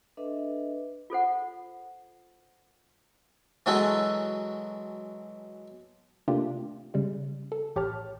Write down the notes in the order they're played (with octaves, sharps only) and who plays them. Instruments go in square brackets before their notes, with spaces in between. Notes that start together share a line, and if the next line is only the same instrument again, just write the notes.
[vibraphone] D4 A4 B4 D#5 E5
[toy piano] F4 A4 C5 F#5
[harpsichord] E3 F#3 G#3 A4 F#5
[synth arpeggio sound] C3 A3 A#3 D4 F4 G4
C#3 G3 G#3
A4
A1 G4 C#5 A5 F6